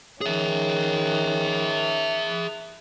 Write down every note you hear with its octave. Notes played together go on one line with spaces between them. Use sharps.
D#3 C#4 G#4 E5